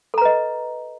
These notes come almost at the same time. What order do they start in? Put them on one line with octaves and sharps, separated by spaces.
A4 A#5 B4 D#5